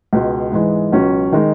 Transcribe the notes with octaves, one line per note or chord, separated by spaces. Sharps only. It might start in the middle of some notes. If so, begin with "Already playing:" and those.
C#2 B2 G#3
G#2 E3 G#3
C#2 B2 F#3 C#4
D#3 G#3 D#4